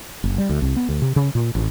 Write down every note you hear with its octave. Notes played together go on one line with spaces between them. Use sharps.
F#1
G3
D2
C2
B3
D2
C3
C#3
A#2
A1